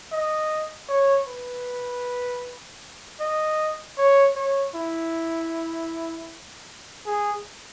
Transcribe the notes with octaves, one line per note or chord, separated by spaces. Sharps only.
D#5
C#5
B4
D#5
C#5
C#5
E4
G#4